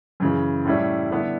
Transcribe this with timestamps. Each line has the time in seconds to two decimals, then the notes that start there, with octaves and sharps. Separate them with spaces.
0.20 F#2 C#3 E3
0.65 A2 G3 C#4 E4
1.11 D3 G3 B3 E4